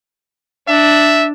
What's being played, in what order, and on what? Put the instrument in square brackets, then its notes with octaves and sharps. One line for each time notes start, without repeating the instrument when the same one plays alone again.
[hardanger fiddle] D4 [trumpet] E5